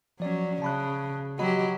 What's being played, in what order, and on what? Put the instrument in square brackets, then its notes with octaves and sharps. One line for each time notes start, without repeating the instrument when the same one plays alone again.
[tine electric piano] F3 D5 [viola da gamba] F#3 C#4
[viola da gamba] C#3 [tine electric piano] A5 B5 F#6
[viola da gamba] F#3 G4 [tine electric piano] F#4 D#5 B5